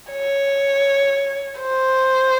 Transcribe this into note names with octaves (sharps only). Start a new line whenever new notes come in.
C#5
C5